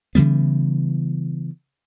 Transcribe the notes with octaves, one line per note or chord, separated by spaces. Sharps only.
C#3 E3 G3 B3